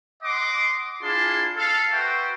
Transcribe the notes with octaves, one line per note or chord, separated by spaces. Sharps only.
D#5 F#5 C6 D6
D4 E4 F4 G#4 A5 C6
A4 F5
F#4 B4 C5 E5 G5